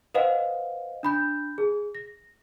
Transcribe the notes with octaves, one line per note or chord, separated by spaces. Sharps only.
B4 C5 D#5 F5 F#5
D4 B5 G6
G#4
A#6